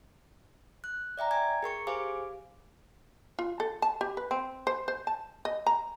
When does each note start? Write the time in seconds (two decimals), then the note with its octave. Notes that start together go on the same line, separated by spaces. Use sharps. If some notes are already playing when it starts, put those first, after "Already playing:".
0.84 F#6
1.18 D5 E5 G5 A#5
1.31 G5 G#5 G#6
1.63 G#4 A#4 C#6 C#7
1.87 G4 G#4 C5 F5 G#5 D6
3.39 F4
3.60 A4
3.82 A5
4.01 G4
4.17 B4
4.31 C4
4.67 C5
4.88 C5
5.07 A5
5.45 D#5
5.67 A#5